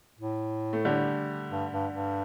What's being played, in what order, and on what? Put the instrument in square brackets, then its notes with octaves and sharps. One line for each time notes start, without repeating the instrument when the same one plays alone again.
[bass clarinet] A2
[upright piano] A3
D3 G3
[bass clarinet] G2
G2
G2